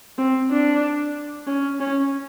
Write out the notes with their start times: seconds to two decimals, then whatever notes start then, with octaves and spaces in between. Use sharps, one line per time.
0.18 C4
0.50 D4
1.47 C#4
1.80 C#4